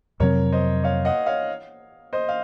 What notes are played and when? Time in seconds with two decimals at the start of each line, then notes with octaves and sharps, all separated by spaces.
0.20 F2 C3 F#3 C4 A#4 C#5
0.52 C5 D#5
0.84 C#5 F5
1.05 D#5 F#5
1.26 C#5 F5
2.13 C5 D#5
2.29 F5